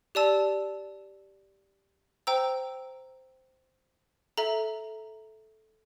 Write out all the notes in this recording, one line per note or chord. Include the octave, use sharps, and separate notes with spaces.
G4 D5 A5 E6
C5 G5 A#5 E6
A4 E5 A#5